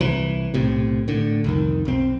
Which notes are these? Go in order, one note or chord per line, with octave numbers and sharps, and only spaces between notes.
C2 E3
B1 A2 C3
A2 D3
C2 F2 D#3
B1 C4